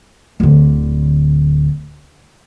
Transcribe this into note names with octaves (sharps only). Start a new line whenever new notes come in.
D1 D3